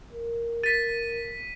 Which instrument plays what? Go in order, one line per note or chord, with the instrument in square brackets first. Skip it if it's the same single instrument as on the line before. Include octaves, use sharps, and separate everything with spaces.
[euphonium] A#4
[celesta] A6 [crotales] B6 D#7